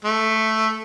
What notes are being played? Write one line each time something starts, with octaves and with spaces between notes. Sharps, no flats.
A3